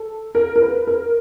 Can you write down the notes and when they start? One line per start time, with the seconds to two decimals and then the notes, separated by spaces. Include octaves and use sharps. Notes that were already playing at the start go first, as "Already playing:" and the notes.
Already playing: A4
0.35 A#4
0.56 A#4
0.62 B4
0.87 A#4